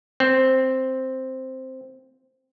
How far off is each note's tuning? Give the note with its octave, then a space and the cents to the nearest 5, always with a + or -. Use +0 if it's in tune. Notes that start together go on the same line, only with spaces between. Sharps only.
C4 +0